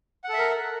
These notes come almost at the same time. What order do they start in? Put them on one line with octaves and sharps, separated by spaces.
F#5 A4 E5 A#4